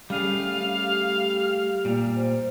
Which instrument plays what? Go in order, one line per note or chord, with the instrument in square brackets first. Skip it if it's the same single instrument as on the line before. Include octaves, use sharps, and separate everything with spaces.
[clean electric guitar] G3 A3 G#4 [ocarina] C#4 [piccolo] F5
[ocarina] G4
[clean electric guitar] A#2 G3
[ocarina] C5